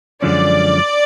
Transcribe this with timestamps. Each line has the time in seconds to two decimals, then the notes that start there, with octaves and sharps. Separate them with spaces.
0.22 F#2 D3 F3 G#3 C#4 D5